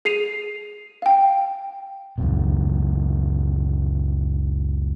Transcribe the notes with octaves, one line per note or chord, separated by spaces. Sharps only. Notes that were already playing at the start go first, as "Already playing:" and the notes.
G#4 C7 D#7 F7
F5 G5
C#2 F#2 B2